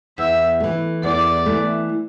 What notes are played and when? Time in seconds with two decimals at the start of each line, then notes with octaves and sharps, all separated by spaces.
0.18 E2 E5
0.60 E3 A3
1.03 E2 D5
1.46 E3 A3